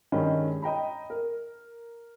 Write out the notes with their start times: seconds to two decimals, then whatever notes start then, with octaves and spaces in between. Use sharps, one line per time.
0.12 G2 D#3 G#3 C#4 B5
0.62 D#5 G5 A#5 B5
1.10 A#4